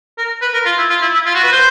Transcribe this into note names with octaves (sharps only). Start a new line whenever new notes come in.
A#4
B4
A#4
F4
E4
F4
E4
E4
F4
F#4
B4
C5